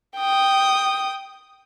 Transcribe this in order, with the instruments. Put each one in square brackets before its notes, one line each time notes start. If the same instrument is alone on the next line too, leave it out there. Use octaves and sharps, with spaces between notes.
[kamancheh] G5 D#6